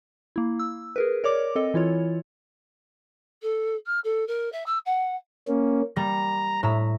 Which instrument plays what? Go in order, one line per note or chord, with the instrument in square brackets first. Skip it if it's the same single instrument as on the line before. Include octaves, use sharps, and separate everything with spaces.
[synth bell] A#3 E4
E6
G#4 A#4 B4
A#4 C#5 D5 D6
C4 A4 D#5
E3 E4 F4 C#5
[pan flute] A4
F6
A4
A#4
E5
E6
F#5
[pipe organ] A#3 C#4
[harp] G3 A#3 [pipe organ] A#5
[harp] A2 E5 A#5